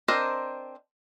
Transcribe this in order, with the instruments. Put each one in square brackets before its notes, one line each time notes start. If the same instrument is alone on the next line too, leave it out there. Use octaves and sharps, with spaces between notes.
[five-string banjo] C4 D4 A#4 C5 D#5